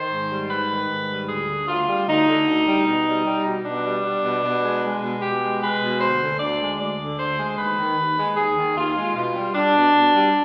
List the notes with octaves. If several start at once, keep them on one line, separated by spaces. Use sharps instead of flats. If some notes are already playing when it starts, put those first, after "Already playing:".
Already playing: D#3 C5
G#2
G3
G#2 B4
D#3
G#2
G3
D2 G#4
D3
D2 F4
G3
D2 D#4
D3
D2
G3
B2
G3
G3
B2
B2 D4
G3
G3
B2
B2
G#3
G#3
B2
B2 G4
G#3
G#3 B4
B2
D2 C5
D3
D2 D5
G#3
D2 D5
D3
D2 C5
G#3
D#2 B4
D#3
D#2
G#3
D#2 G#4
D#3
D#2 F4
G#3
B2 F4
G3
G3 D4
B2
B2
G3